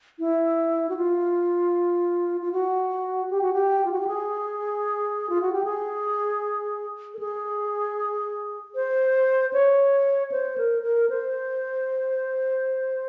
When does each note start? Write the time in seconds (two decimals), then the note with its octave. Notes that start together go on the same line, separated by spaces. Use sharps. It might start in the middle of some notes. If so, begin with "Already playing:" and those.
0.19 E4
0.89 F#4
0.97 F4
2.42 F4
2.52 F#4
3.31 G4
3.42 F#4
3.53 G4
3.85 F4
3.92 F#4
4.00 G4
4.07 G#4
5.29 F4
5.41 F#4
5.52 G4
5.64 G#4
7.14 A4
7.19 G#4
8.75 C5
9.53 C#5
10.32 C5
10.58 A#4
10.82 A#4
11.10 C5